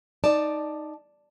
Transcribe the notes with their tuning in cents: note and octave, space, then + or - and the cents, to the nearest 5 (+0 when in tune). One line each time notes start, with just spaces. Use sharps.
D#4 +0 D5 +10 A5 +0